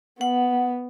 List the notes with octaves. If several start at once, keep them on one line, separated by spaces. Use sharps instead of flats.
B3 F#5